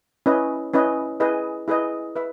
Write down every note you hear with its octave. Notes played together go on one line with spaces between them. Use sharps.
C#4 E4 B4 D#5
C#4 E4 B4 D#5
E4 G#4 B4 D#5
E4 G#4 B4 D#5
B4 E5